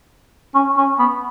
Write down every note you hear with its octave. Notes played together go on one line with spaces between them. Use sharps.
C#4
C#4
B3